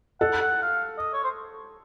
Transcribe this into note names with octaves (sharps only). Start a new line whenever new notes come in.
A4 F#5
F#5
F5
D#5
C#5
C5